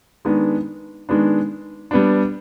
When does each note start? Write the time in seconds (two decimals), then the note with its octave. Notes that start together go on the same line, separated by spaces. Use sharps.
0.25 D#3 G#3 B3 D4
1.09 D#3 G#3 B3 D4
1.91 G3 B3 D4